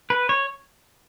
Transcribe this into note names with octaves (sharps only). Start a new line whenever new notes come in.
B4
C#5